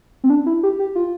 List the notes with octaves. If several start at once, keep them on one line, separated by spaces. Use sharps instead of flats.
C4
D4
E4
G4
G4
F4